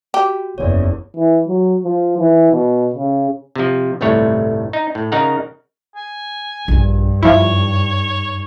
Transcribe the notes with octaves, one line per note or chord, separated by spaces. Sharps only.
F#4 G4
F#1 E2 C#5 D5
E3
F#3
F3
E3
B2
C#3
C3 F3
G1 C2 A2 A3 C#5
D#4
A2
C#3 D#4 A#4 F5 F#5
G#5
A#1 G2 A#2
F3 D#4 E4 C#5